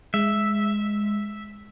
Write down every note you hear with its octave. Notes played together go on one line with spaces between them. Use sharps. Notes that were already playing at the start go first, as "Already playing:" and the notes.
G#3 E5